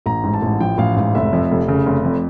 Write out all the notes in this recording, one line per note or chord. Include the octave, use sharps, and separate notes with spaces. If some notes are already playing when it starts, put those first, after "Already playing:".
A1 A#5
G#2
A5
A1
F3 G5
A1 F5
G#2 F5
F1 E5
F2
F1
C#3
F1
F2